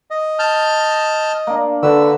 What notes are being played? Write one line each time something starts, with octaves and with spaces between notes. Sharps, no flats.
D#5
A5 F6 G6
A#3 D4
D3 F#4 B4 E6